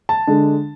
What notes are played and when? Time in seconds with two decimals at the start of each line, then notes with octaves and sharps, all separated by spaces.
0.09 A5
0.27 D3 G#3 D4